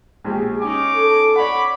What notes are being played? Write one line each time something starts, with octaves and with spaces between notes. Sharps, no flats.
A#1 G#3 G4
C#4 D#4 G#5 D6
A4
C#5 D5 F#5 B5 D6